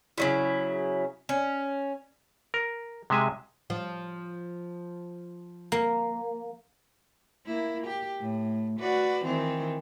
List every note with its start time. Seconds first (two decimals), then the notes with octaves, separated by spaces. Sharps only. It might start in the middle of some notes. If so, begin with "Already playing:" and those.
0.18 C#3 F#3 E4
1.29 C#4
2.54 A#4
3.10 C3 G#3 E5 G#5
3.70 F3
5.72 A#3
7.46 A#3 E4
7.86 G4
8.19 A2
8.80 F#4 B4 D5
9.24 D#3 E3 C4